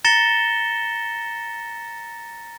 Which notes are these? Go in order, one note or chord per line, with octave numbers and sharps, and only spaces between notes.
A#5 A6 A#6 C#7 E7 G7